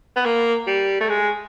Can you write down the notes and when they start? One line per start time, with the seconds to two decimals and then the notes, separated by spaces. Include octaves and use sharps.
0.16 B3
0.26 A#3
0.67 G3
1.01 A3
1.09 G#3